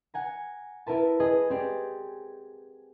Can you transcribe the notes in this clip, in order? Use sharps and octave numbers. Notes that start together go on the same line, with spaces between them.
F#5 G#5 A#5
E4 A#4 B4 A5
G#4 B4 D#5
C4 G4 G#4 D5